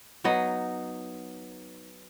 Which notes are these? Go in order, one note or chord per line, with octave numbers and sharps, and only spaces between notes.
F#3 B3 D#4 D#5